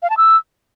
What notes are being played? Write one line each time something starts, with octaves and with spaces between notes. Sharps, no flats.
F5
A5
E6